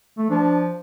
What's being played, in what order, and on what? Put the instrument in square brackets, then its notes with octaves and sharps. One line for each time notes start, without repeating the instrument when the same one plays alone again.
[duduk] A3
[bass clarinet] F3 [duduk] D4